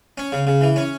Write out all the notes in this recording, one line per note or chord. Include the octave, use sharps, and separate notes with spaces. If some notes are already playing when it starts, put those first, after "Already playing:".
C#4
C#3
C#3
E3
C#4